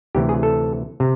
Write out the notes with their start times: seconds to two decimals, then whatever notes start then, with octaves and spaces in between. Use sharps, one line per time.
0.15 D2 C3 E3 G4
0.29 G#4
0.43 A4
1.00 C3